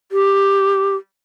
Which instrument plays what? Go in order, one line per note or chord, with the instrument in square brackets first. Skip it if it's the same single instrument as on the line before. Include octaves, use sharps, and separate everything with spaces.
[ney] G4